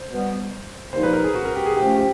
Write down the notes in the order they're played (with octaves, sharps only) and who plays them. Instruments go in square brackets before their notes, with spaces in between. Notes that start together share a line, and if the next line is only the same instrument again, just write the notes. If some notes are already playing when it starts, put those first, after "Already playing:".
Already playing: [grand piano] C5
[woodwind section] B2 G3 B3
[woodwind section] C2 A#2 F3 A#3 D#4 [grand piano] C5
[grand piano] B4
A#4
G#4
F#4
A#4
G4
G#4
[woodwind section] F3 A3 C#4 [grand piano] G4
[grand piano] G4